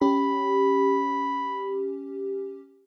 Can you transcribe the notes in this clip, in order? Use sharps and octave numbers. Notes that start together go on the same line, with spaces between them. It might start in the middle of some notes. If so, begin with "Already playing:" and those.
C#4 G4 B5